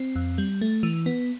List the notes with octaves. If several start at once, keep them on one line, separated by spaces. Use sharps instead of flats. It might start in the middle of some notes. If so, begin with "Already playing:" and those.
Already playing: C4
F2
G3
A3
E3
B3